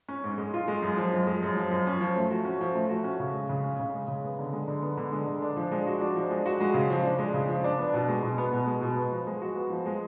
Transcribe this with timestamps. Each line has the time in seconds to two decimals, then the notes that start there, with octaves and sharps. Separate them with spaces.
0.08 C#4
0.24 G#2
0.38 G#3
0.54 F4
0.68 G#3
0.82 F#2
0.97 F3
1.13 F#2
1.27 G#3
1.43 F#2
1.57 F3
1.71 F#2
1.87 C#4
2.01 F3
2.16 A3
2.31 F#4
2.45 C#4
2.61 F3
2.75 A3
2.89 F#4
3.04 C#4
3.20 C#3
3.34 G#3
3.49 C#3
3.64 C#4
3.79 C#3
3.94 G#3
4.08 C#3
4.24 B3
4.38 D3
4.53 G#3
4.68 D3
4.82 B3
4.97 D3
5.12 G#3
5.26 D3
5.42 D4
5.56 F3
5.72 G#3
5.87 F#4
6.01 D4
6.16 F3
6.31 G#3
6.46 F#4
6.60 G#3
6.74 C#3
6.90 F3
7.04 D4
7.19 G#3
7.34 C#3
7.48 F3
7.64 D4
7.79 B3
7.94 B2
8.08 G#3
8.23 B2
8.38 B3
8.53 B2
8.67 G#3
8.81 B2
8.96 B3
9.11 F3
9.27 G#3
9.42 F#4
9.56 B3
9.70 F3
9.86 G#3